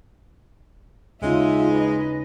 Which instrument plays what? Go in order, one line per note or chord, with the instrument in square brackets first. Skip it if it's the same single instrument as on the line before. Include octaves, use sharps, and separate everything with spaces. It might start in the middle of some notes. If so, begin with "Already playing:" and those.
[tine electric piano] D#2 C#3 C#4 [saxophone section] G#3 [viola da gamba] D#4 [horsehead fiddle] F4 E5
[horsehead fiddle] B4 D#5